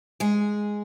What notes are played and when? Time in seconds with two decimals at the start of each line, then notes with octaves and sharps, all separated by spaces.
0.20 G#3 G#4